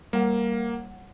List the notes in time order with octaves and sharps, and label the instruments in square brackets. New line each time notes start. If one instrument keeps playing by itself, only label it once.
[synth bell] G3 F#5 [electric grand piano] A#3